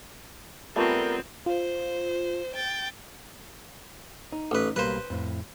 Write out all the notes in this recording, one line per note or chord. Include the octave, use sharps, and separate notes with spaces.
G3 A3 B3 C4 F4 A#4 C#6
F4 C5
G5 A6
D#4
A1 B4
B1 G3 A#3 B4 C5
F2 A2